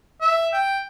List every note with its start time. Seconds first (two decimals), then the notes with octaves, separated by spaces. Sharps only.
0.21 E5
0.53 G5